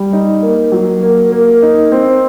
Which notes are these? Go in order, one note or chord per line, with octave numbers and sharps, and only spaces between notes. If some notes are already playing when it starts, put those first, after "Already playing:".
Already playing: G3
D#4
A#3
F#3
A#3
A#3
D#4
C4